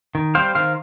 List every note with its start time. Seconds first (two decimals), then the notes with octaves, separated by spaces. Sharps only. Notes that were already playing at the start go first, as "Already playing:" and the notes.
0.15 D#3
0.35 G3 C4 C5 F5
0.55 D#3 C5 F5